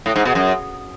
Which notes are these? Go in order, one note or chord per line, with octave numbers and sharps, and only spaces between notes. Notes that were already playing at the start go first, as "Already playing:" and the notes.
A2
G#2
B2
F#2